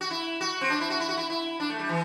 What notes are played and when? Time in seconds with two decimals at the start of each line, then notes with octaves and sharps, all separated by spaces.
0.01 F#4
0.11 E4
0.41 F#4
0.61 C4
0.70 D4
0.80 E4
0.90 F#4
1.00 E4
1.09 F#4
1.17 E4
1.30 E4
1.60 D4
1.70 A3
1.79 G3
1.89 E3